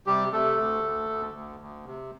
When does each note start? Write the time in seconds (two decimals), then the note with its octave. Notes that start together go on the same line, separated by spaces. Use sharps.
0.06 C3 G3 G4
0.32 C3 A3 A4
0.58 D2
0.84 D2
1.09 D2
1.34 D2
1.60 D2
1.86 C3